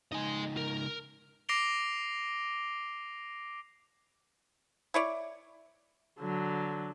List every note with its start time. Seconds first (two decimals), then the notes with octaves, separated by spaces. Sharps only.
0.13 C#2 D#4 D#5 G#5
0.57 A#4
1.49 D6 A#6 C7 D7 F7 G7
4.94 E4 C#5 D5
6.19 D3 F#3